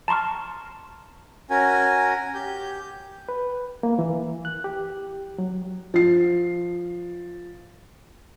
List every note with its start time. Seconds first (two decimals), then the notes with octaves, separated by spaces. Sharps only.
0.08 A5 A#5 C6 C#6 F6
1.50 C#4 F#4 A#4 G#5
2.34 G4 G6
3.29 B4
3.83 A#3
3.99 E3
4.45 F#6
4.64 G4
5.38 F#3
5.94 F3 C7